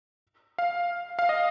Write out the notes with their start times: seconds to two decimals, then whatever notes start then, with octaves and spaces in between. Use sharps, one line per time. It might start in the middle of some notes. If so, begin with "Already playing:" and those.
0.58 F5
1.19 F5
1.29 D#5